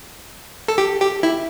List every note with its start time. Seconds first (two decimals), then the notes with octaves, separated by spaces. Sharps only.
0.68 A4
0.78 G4
1.01 G4
1.23 E4